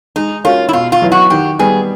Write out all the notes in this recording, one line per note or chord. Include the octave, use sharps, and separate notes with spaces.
G#3 D#4
C#4 F4 F#4 A#4 C#5
E4
B2 F4
F4
F#3 B3 E4
F#4
D#3 G4
G3 B3 G#4